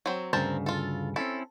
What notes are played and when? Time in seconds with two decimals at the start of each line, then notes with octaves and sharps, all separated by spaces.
0.06 F#3 C4
0.33 D2 G2 C#3 C4 A#4 A5
0.66 F4 A4
1.16 C4 C#4 E4 A4